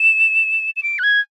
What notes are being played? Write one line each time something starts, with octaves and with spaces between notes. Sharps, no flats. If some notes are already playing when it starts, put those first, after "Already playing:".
Already playing: E7
E7
D7
F#6
G#6